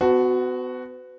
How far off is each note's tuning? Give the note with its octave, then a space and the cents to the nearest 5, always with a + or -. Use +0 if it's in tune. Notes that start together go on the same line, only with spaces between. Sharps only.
B3 +40 F#4 +0 A5 +0